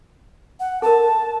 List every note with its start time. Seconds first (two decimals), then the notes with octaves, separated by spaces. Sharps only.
0.60 F#5
0.82 A4 A#4 A5